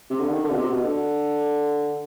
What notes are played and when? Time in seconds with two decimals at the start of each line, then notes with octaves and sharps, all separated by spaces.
0.10 C3
0.20 D3
0.29 D#3
0.43 D3
0.51 B2
0.57 C3
0.70 B2
0.84 D3